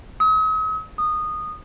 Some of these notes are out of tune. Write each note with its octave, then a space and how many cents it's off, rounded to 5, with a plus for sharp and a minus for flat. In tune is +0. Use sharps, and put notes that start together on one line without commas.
D#6 +45
D#6 -15